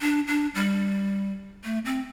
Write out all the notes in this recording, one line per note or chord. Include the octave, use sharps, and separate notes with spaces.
D4
D4
G3
A3
C4